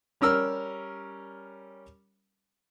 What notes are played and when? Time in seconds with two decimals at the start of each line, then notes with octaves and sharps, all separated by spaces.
0.21 G3 C#4 A#4 E6 F6